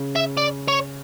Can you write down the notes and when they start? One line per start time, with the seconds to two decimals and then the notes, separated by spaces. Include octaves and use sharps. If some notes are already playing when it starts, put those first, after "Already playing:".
Already playing: C#3
0.16 E5
0.37 D5
0.68 C#5